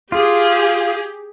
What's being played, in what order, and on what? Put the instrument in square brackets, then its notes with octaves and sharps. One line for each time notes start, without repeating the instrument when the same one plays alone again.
[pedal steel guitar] F4 [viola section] G4 G#4